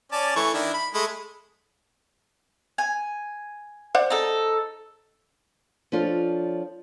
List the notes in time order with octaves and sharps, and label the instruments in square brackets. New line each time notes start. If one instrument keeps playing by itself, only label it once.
[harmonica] C#4 D5 A5
E3 A3 C#6
D#3 D4 E4
B5
G#3 A3 B5
[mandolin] G#5
[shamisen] C5 D5 F#5
[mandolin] D#4 A4
[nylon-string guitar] F3 C#4 D4 F4 A4